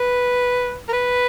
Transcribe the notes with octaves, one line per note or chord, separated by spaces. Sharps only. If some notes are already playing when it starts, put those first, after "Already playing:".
Already playing: B4
A#4
B4